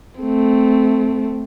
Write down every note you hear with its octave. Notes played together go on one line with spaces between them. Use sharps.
A3 C4